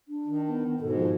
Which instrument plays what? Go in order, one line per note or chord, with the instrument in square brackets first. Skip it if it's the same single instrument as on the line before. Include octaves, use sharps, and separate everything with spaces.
[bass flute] D4
[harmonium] D#3
[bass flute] B3
[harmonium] G#2 B2 [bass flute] A4
[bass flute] F3